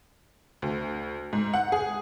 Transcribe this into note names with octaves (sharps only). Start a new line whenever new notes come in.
D2
G#2
F#5
G#4